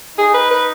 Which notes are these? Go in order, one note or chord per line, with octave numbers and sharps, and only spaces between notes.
D#4 G#4
B4
B4